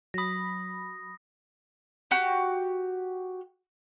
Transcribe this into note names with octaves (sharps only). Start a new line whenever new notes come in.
F#3 B5 D#6 A#6
F#4 G4